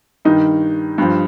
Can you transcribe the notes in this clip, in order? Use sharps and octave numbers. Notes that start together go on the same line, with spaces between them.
G2 D#3 D#4
G2 F3